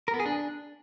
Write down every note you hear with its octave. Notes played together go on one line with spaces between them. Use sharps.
A#4
B3
G#4
D4